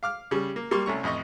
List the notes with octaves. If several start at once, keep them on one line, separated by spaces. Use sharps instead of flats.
F5 D6 F6
C#3 G3
A#3
G3 A#3 C6 C#6
C2 A3 C#4 A#5 C#6
A1 F2 D#5 C#6